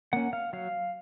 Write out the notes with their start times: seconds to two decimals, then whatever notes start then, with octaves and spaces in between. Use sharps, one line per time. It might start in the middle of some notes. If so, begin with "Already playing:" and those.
0.13 A#3 C#4 F#5
0.33 F5
0.53 F#3 F5